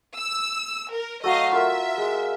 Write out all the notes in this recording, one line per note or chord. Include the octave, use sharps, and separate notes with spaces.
E6
A#4
F#3 A3 D#5 F5
F4 A#4 E5
G#3